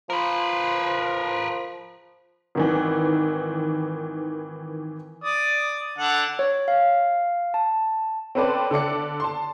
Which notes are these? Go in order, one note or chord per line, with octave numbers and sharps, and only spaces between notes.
F3 A#4 B4
G#1 D#3 E3
D5 D#6
D3 F#5 A5
C#5
F5
A5
C4 C#4 A4 B4 C5 D5
D3 A4 D5 C#7
A5 C6